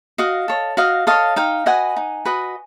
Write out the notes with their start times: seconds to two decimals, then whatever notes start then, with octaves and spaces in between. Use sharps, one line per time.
0.18 F#4 D#5 F5
0.48 A4 C#5
0.77 F#4 D#5 F5
1.07 A4 C#5 D#5 F5
1.36 D#4 F5 G5
1.66 F#4 B4 D#5 F#5 G#5
1.96 D#4
2.25 F#4 B4 D#5